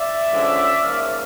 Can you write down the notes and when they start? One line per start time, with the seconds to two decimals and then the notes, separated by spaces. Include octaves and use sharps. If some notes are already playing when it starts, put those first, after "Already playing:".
Already playing: D5 E5
0.30 D3 F3 G#3 C#4
0.83 G#2 F3 A#3 C#4